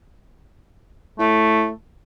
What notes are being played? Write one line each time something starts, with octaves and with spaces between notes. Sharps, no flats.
A2 A3